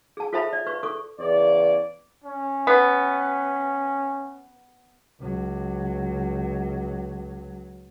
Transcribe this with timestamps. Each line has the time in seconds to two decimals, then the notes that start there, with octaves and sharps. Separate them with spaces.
0.17 G#4 A5
0.33 F4 A4 C5 E5 A5 B5
0.53 D5
0.67 B4 C#6
0.83 A4 C#6 D6
1.19 E2 C#3 C#5 D5
2.24 C#4
2.67 B3
5.20 C#2 F#3